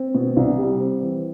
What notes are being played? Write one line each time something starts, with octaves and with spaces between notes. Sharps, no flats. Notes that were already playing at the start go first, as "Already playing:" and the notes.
Already playing: C4
B2
C2
G3
C4
E3